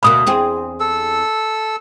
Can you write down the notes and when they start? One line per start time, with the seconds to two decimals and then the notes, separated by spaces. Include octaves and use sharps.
0.03 D2 B2 A#3 B5 D#6
0.26 E2 C4 G#4
0.80 A4 E6